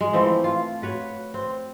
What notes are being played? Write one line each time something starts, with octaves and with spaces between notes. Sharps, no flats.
G#3
E3 F3 A3 C4
F4
F#4 B4 C#5
C4